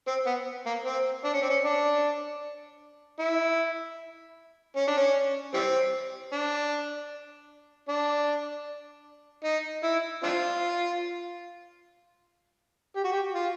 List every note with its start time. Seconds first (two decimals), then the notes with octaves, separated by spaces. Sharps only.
0.08 C4
0.27 B3
0.66 A#3
0.86 C4
1.25 D4
1.34 C#4
1.42 C4
1.50 C#4
1.63 D4
3.19 E4
4.77 C#4
4.88 D4
4.97 C#4
5.54 E3 G3 C4
6.33 D4
7.88 D4
9.44 D#4
9.84 E4
10.23 C4 D4 F4
12.96 G4
13.04 F#4
13.12 G4
13.35 F4